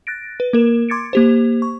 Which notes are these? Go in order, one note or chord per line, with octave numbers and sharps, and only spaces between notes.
F#6 A6 A#6 D7
B4
A#3 A#4 E7
C6 D6 G#6 A6 C#7 D7
A#3 G4 C5
C#6